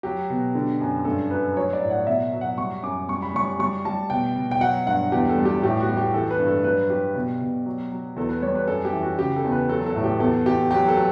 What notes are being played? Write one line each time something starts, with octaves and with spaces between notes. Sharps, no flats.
F#3 G4
B2
D3
F#2
G2 A4
F#3 B4
F#3 C#5
D5
A2
F#5
B2 E5
F#3
F#5
G3 C#6
F#2 D6
G3 C#6
B5
G3 C#6
G3 C#6
G3 A5
B2 G5
B2
G5
F#3 F#5
G2 F#5
E2 G4
A4
G3
G4
A2 G4
F#4
G3
G4
E3 A4
B4
G2
A4
F#3 B4
F#3 G4
B2
B2
F#3
F#3
E2 A4
B4
G3 C#5
B4
F#2 A4
G4
E3
F#4
C#3 G4
A4
E2
B4
F#3 A4
A4
A2
G4
E2 A4
E2 G4
F#3 G4
A4
F#3